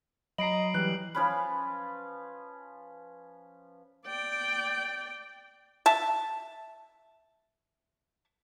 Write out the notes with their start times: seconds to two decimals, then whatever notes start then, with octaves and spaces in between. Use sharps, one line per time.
0.38 F#3 D#5 A#5 B5 C7 D7 F#7
0.74 E3 G3 F#6
1.15 F3 C#4 B4
4.07 D5 G5
5.86 E5 A5